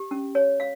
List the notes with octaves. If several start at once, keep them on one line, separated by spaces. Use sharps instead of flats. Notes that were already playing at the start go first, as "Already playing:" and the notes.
Already playing: G4
C#4
C#5
F5